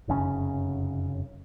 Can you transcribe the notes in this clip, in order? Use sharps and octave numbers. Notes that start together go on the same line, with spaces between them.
F1 F#2 C#3 C#4